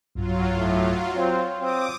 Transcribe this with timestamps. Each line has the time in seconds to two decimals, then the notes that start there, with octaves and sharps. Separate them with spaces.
0.15 B1 G2 F#3 F4
0.56 A2
1.16 C4 C#5 F5 C6
1.61 C4 D6 D#6